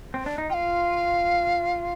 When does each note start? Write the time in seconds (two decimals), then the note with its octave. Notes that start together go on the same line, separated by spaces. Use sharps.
0.14 C4
0.26 D4
0.38 D#4
0.50 F4 G5
0.54 F5